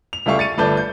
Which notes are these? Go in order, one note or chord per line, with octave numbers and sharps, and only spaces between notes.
F7
C#2 G3 A3 E5 F5 C#6
A6 C#7 D#7
G1 A3 B4 D5 A5 G6
G6